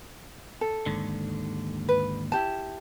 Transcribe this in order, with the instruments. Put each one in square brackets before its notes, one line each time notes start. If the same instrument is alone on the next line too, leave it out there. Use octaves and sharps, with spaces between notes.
[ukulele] A4
[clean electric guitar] D#2 G#2 D3
[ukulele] B4
E4 G4 A5